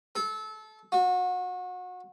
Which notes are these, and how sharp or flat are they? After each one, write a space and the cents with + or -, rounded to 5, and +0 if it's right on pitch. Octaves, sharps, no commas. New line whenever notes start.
A4 -25
F#4 -30